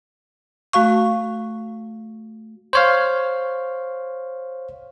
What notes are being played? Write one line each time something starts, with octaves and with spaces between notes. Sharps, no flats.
A3 F#4 F5 C#6
C5 C#5 F5